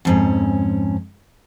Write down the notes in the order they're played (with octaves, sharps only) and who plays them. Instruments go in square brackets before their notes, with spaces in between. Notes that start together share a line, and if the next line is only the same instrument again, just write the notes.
[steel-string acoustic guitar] F2 G#2 C#4